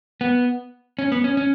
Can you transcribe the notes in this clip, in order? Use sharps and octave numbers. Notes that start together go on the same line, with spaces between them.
B3
C#4
B3
C#4
C#4